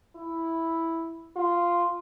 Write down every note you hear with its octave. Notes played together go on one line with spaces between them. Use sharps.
E4
F4